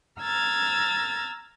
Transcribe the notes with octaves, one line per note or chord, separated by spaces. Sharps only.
A#5 E6 F6 G#6 A6